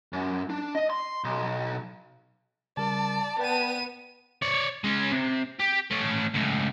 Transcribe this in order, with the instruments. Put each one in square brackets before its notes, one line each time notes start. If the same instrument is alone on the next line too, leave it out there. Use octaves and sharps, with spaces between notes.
[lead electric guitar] F#2
D4
D#5
C6
B1
[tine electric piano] C#3 G3 A#4 [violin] D5 [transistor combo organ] A5
[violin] B3 D#7 [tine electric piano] B4 D5 G5
[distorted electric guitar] C#5 D5
G#3 C#4
C3
G4
A3 C#4
C#2 A2